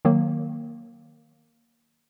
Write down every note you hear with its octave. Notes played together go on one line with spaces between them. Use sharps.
D#3 F#3 A#3